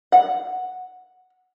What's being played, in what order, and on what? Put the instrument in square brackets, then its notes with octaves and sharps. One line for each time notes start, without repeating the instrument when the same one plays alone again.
[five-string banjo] F#5